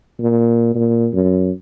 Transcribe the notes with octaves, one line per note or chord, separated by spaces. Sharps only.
A#2
A#2
F#2